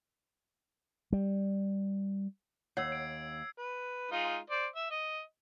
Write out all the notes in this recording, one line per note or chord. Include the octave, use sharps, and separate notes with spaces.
G3
D#2 C#5 F#5 E6 G#6 C7
G#6 D7
B4
G#3 D#4 F4
C5 D5
E5
D#5